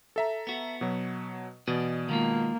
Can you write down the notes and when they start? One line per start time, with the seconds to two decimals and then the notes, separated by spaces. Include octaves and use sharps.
0.16 A4 E5 A#5
0.47 B3 F#4
0.81 B2 F#3
1.67 B2 E3 D5 D#5
2.09 D#3 G#3 A#3 F4